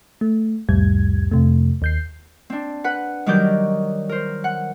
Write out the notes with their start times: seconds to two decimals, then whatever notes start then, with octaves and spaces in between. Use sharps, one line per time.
0.21 A3
0.69 C2 F2 A2 G3 G#6
1.31 F2 C3 A3
1.82 D#2 G6 C7
2.50 C4 D4
2.84 B4 F#5
3.26 D#3 F#3 G3 A#4 D6 G6
4.09 A#4 C5
4.44 F#5